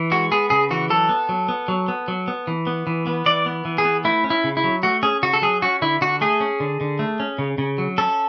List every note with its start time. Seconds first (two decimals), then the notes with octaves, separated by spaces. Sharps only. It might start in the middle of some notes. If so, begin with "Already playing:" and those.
Already playing: E3
0.11 G#3 F#4
0.31 B3 G#4
0.50 C#3 G#4
0.71 E3 F#4
0.90 F#3 A4
1.09 B3
1.29 F#3
1.49 B3
1.68 F#3
1.88 B3
2.08 F#3
2.28 B3
2.47 E3
2.67 B3
2.87 E3
3.07 B3
3.26 E3 D5
3.46 B3
3.65 E3
3.78 G#4
3.85 B3
4.04 A3 E4
4.24 C#4
4.30 E4
4.44 C#3
4.57 E4
4.64 F#3
4.83 A3 F#4
5.03 C#4 G#4
5.23 C#3 F#4
5.33 A4
5.42 F#3 G#4
5.62 C#4 F#4
5.82 D3 E4
6.01 D3 F#4
6.21 A3 G#4
6.40 C#4
6.60 D3
6.81 D3
6.99 A3
7.20 C#4
7.39 C#3
7.58 C#3
7.78 F#3
7.98 C#4 A4